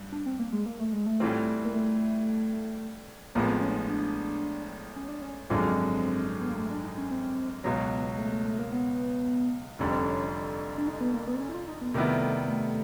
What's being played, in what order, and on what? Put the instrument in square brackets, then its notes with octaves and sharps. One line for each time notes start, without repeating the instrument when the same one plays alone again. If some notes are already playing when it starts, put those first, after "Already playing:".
Already playing: [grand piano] G2
[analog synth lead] D4
C4
A#3
G#3
A#3
A3
G#3
A3
[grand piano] A2 E3 G3 C4 F4
[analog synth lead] A#3
A3
[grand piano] A1 A2 F3 G#3 B3 [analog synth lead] A#3
[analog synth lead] C4
C#4
D4
D#4
D4
C#4
D4
C#4
[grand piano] G#1 F#2 D3 F3 G#3 [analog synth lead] C4
[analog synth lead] B3
A#3
A3
D4
D#4
C#4
C4
[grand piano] C#2 B2 F#3 [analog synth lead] B3
[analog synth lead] A3
A3
A3
A#3
B3
[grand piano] F1 F2 D3 G3 [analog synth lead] C#4
[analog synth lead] C4
C#4
D4
D#4
B3
A#3
B3
C4
C#4
E4
F4
D#4
B3
[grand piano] C3 D#3 G3 B3 E4 [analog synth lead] A3
[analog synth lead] A3